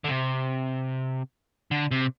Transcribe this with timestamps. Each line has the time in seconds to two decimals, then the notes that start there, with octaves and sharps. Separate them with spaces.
0.04 D3
0.08 C3
1.71 D3
1.91 C3